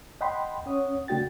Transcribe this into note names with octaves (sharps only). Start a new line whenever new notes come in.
D#5 F#5 G5 B5 C6
C#4 C#5 F#5 D#6
C#3 A3 D4 F#4 G5 A6